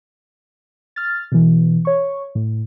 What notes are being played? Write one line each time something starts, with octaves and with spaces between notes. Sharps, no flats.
F6 A6
B2 E3
C#5 C#6
A2